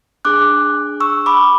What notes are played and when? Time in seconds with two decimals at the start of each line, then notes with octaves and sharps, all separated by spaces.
0.25 D4 G#4 D6 F#6
1.00 C#6 E6
1.26 B5 D6